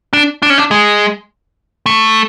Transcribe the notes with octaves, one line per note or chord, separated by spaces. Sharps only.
D4
D4
C#4
D4
G#3
A3